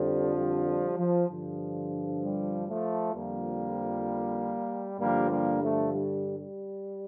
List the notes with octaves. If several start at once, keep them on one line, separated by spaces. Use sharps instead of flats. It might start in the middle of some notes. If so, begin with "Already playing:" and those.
Already playing: F2 D3 F3 G3
G3
G3
F3
G2 D3 F3
G3
F3 A3
F2 D3 F3 G3 A#3
G2 D3 F3 G3 A#3
G3 A#3
F3 A3
G3
G3